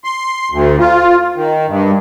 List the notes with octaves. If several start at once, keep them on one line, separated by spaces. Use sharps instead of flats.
C6
D2
F4
D#3
G2